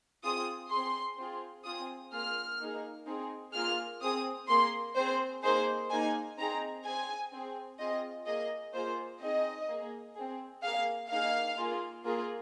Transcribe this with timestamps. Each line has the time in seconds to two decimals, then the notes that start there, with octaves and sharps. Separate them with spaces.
0.23 C4 F4 G#4 D#6
0.71 C4 G#4 C6
1.18 C4 F4 G#4
1.65 C4 F4 G#4 D#6
2.13 A#3 F4 G#4 F6
2.60 A#3 D#4 G#4
3.07 C4 D#4 G#4
3.54 A#3 F4 G#4 F6
4.02 C4 G#4 D#6
4.49 A#3 G#4 C6
4.96 C4 G#4 C5
5.43 A#3 D#4 G#4 C5
5.91 A#3 D#4 G#4 G#5
6.38 C4 D#4 G#4 A#5
6.85 C4 G#4 G#5
7.32 C4 G#4
7.79 C4 F4 G#4 D#5
8.26 A#3 G#4 D#5
8.74 A#3 F4 G#4 C5
9.21 C4 D#4 G#4 D#5
9.69 A#3 G#4
10.16 C4 G#4
10.63 A#3 G#4 F5
11.10 A#3 D#4 G#4 F5
11.57 A#3 F4 G#4
12.05 A#3 F4 G#4